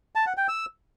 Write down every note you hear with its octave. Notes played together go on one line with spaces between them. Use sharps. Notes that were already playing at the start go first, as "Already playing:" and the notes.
A5
F#5
G5
E6